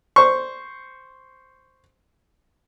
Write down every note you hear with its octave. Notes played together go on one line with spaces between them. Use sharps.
C5 C#6